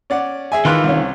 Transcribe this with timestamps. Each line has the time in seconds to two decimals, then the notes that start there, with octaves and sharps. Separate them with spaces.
0.10 C#4 D5 F#5
0.52 G#4 E5 G#5
0.65 D#3 E3 F4 B4 F#6
0.84 C2 C#4